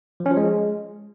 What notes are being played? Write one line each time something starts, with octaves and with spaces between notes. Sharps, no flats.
F3
C#4
F3
G#3